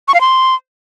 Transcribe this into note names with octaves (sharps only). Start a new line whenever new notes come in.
C#6
F5
C6